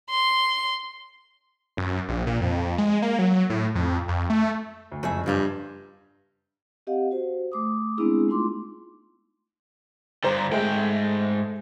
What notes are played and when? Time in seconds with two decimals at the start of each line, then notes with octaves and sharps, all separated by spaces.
0.10 C6
1.77 F#2
2.08 A#1
2.27 A#2
2.41 F2
2.78 G#3
3.02 A#3
3.19 F#3
3.50 A2
3.75 F2
4.08 F2
4.30 A3
4.92 D2
5.03 F#1 F2 A3 G#4 E5
5.26 G2 F3 F5 A#5
6.87 C4 G4 D#5 F5 F#5
7.11 F#4 C5
7.52 A3 D6 D#6
7.97 G#3 B3 C4 D4 E4 G#4
8.28 A3 D#4 F4 C6 D6
10.24 G2 D3 C5 A#5
10.51 G#2 G#3 A3 G5